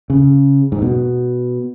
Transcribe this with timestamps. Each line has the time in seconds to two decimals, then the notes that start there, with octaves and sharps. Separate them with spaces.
0.10 C#3
0.72 G#2
0.82 B2